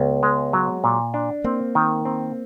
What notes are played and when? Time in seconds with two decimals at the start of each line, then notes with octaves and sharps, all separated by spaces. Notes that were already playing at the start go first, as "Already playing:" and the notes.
Already playing: C#2 B3
0.23 G#3
0.53 F#3
0.84 A#2
1.14 D4
1.44 A#3 C4
1.75 D#3
2.05 C4